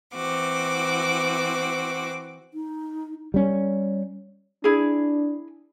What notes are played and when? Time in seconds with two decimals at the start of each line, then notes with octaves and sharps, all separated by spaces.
0.14 E3 C4 F#4 D6
2.54 D#4
3.34 G3 C#4
4.64 D4 E4 G#4